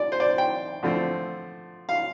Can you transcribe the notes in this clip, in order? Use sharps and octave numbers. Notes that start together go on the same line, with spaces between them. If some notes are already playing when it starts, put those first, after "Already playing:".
Already playing: D5
C5
D5
G5
D3 F3 A3 C4
F5